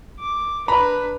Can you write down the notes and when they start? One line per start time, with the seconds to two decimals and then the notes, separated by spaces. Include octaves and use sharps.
0.19 D6
0.68 D4 B4 A#5 B5